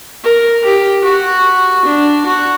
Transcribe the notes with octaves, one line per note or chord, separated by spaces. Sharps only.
A#4
G4
F#4
D4
F#4